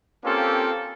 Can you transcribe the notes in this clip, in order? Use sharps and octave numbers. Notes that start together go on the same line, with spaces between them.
A#3 C4 C#4 F4 G4 A4